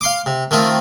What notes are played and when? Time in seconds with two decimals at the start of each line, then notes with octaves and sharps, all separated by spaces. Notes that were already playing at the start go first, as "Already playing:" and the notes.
0.01 F5 C6 D6
0.26 C3
0.51 D#3 A3 C4 F4